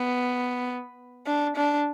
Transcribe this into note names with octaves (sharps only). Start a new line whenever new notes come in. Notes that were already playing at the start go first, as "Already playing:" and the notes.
Already playing: B3
D4
D4